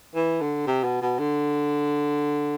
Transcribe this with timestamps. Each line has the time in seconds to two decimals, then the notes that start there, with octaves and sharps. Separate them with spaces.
0.15 E3
0.41 D3
0.67 C3
0.84 B2
1.02 B2
1.19 D3